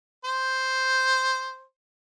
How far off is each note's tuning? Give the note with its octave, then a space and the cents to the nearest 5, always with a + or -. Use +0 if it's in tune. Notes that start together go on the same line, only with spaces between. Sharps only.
C5 +0